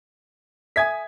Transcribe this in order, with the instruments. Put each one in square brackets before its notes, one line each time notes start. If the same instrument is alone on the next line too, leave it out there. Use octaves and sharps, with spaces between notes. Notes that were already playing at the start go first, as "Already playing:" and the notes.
[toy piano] A4 E5 D#6 [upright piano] G#5 G#6 B6